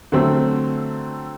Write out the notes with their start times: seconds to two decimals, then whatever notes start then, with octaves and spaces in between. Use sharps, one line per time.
0.12 D3 F#3 A3 C4